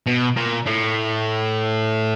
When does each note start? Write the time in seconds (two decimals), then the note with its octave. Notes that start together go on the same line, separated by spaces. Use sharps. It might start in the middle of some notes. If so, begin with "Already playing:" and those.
0.07 B2
0.37 A#2
0.66 A2